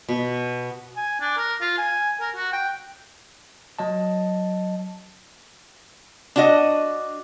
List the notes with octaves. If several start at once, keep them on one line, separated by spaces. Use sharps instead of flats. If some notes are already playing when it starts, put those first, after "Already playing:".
B2
G#5
D4
A#4
F4
G#5
A#4
F#4
G5
F#3 D#5 A5
D4 F#4 D#5